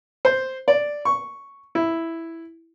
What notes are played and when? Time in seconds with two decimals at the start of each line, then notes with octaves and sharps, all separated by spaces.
0.25 C5
0.68 D5
1.05 C#6
1.75 E4